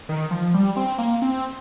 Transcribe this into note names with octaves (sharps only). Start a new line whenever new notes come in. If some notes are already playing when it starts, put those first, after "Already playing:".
D#3
F3
G3
C4
A#3
C4